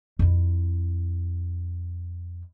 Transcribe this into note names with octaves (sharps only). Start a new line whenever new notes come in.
F2 E4